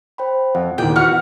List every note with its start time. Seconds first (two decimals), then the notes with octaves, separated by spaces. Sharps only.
0.18 C5 G5 B5
0.55 F2 F#5
0.78 D#2 A#2 G#4 D5 G5
0.96 E2 E3 E4 F#4 F#5 F6